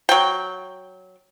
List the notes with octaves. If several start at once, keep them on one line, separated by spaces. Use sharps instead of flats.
F#3 G5